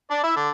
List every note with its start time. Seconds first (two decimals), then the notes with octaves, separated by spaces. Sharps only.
0.10 D4 D5
0.23 E4 E5
0.36 D3 D4